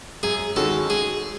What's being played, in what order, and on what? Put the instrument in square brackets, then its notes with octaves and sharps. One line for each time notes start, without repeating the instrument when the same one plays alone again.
[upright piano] F#2 [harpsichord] G#4
[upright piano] D#3 G#3 C#4 F#4 [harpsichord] A4
[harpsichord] G#4